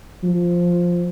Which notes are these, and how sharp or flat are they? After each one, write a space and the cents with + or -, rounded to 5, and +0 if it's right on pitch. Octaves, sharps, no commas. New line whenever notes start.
F3 +0